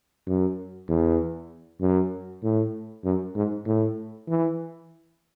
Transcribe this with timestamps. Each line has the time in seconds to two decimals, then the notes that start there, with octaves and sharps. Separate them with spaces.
0.27 F#2
0.89 E2
1.82 F#2
2.44 A2
3.05 F#2
3.36 G#2
3.67 A2
4.29 E3